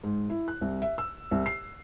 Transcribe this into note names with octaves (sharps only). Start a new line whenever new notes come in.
G#2
E4
F#6
C2
E5
E6
C2
C7